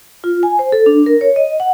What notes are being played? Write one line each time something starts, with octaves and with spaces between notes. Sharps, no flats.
F4
G#5
C5
A4
D4
A#4
C#5
D#5
F#5